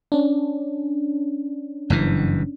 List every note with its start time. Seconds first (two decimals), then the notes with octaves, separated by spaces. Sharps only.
0.12 C#4 D4
1.90 F#1 G2 E3